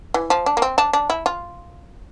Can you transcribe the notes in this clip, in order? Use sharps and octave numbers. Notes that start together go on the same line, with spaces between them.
E3
F3
D4
A#3
C4
D4
D4
E4
F4